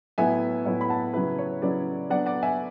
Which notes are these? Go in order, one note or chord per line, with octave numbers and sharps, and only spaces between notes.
A2 F#3 B3 E4 E5 G#5
A2 F#3 B3 E4 C#5 E5
B5
F#5 A5
C#3 F#3 C#4 E4 B4
C#5
C#3 F#3 C#4 E4 B4 D5
F#3 B3 D4 D5 F#5
D5 F#5
E5 G#5